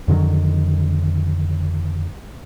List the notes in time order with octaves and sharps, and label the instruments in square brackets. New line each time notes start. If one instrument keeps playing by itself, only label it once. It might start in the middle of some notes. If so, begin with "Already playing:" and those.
[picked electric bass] F2 D3 D#3 F#3